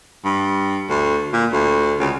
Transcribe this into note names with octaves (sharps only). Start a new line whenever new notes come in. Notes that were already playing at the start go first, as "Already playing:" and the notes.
G2
D2
A#2
D2
C#2